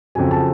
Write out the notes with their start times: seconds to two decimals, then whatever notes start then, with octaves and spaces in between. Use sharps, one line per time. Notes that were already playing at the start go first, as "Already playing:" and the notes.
0.15 F2 C#3 F#3 G#5
0.31 A5